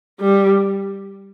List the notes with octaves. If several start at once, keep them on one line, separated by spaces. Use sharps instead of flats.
G3